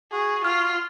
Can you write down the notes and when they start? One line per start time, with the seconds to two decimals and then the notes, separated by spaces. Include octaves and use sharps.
0.12 F#4 G#4
0.45 F4 F6